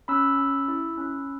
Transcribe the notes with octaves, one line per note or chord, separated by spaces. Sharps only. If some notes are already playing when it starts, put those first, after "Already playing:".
C#4 B5 E6
C#4
E4
C#4